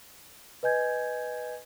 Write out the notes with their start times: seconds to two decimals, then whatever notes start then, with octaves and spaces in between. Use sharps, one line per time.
0.63 B4 D#5 G#5 G6 G#6